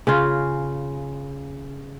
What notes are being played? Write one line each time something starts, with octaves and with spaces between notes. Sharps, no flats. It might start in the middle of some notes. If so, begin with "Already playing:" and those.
C#3 C#4 F4